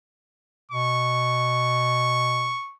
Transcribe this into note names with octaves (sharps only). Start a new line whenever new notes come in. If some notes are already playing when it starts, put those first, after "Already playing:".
B2 C#6